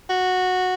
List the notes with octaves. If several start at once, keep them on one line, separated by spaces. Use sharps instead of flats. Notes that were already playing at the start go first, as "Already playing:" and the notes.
F#4